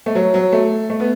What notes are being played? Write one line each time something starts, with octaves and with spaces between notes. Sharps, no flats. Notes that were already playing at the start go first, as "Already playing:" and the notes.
A3
F#3
F#3
A3
A3
B3